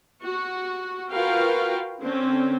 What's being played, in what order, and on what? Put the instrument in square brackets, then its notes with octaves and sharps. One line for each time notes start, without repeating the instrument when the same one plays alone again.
[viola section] F#4
F4 F#4 A#4 B4 F5 G5
D3 C4 C#4